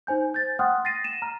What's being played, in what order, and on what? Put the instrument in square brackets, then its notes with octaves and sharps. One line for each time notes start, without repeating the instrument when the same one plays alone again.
[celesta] D#4 C5 G#5 G6
G6 A6
F#5 G5 C6 D#6 F6 F#6
A6 A#6 C7 D#7
D#7 E7
A#5 F6